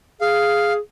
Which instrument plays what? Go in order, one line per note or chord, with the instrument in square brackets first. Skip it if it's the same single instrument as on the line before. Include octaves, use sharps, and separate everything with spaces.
[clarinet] G#4 [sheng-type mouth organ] F5